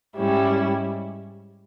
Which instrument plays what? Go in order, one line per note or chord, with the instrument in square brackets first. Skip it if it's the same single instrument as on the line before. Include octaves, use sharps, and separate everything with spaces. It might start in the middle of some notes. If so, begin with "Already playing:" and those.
[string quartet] G#2 G3 C#4 E4